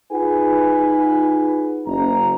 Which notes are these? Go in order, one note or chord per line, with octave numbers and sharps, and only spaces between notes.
D#4 F4 G#4 B4 F#5 G#5
F#1 A#5